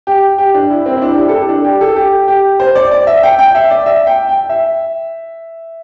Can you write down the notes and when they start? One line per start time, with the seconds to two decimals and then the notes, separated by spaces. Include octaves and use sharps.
0.07 G4
0.38 G4
0.54 D4
0.70 E4
0.86 C4
0.97 E4
1.02 D4
1.11 G4
1.18 E4
1.28 A4
1.33 G4
1.49 D4
1.64 G4
1.81 A4
1.96 G4
2.28 G4
2.60 C5
2.75 D5
2.91 D5
3.07 E5
3.23 G5
3.39 G5
3.55 E5
3.70 D5
3.86 E5
4.07 G5
4.29 G5
4.49 E5